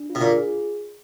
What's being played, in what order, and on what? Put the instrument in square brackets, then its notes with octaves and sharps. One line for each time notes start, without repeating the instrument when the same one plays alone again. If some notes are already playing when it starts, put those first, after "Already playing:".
Already playing: [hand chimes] D4
F4
[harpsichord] B2
A#2
[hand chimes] G#4